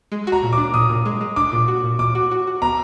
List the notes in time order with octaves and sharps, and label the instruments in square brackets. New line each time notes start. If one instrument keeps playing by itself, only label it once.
[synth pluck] G#3
F#4
[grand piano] A#5
[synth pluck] A#2
[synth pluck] D4 [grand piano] D6
[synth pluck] A#2 [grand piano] D#6
[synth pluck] A#2
G#3
G#3
[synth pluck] D4 [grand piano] D6
[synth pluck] A#2
F#4
A#2
[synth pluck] A#2 [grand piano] D6
[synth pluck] F#4
F#4
F#4
[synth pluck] B3 [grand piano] A#5